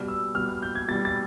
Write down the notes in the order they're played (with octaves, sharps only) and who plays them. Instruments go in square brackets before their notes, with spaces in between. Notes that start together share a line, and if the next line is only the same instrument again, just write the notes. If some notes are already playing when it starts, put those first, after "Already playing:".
Already playing: [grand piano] B2 G3 F6
E6
B2 G3 F6
F6
G6
G#6
B2 G3 A6
A6